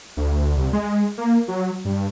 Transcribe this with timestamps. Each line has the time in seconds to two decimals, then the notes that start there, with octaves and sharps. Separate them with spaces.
0.17 D2
0.57 C2
0.73 G#3
1.18 A#3
1.48 F#3
1.85 G2